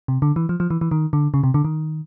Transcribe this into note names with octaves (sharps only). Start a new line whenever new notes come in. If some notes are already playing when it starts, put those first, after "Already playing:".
C3
D3
E3
F3
F3
E3
E3
D#3
D3
C#3
C3
D3
D#3